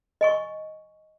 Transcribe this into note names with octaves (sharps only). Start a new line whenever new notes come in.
D#5 G#5 C#6